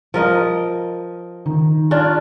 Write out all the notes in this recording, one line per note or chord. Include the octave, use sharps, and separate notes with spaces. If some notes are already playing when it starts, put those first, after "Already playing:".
F3 A#4 D#5
D#3
C#4 D4 F4